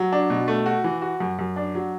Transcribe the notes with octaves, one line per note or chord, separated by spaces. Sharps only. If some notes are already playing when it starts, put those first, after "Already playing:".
Already playing: F#3
D4
B2
A3
F#4
E3
F#4
F#2
F#2
D4
F#3